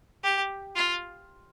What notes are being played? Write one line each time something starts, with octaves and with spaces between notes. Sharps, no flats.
G4
F4